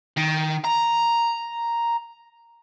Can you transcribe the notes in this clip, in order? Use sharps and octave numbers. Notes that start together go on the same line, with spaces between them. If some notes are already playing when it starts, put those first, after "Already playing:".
D#3
A#5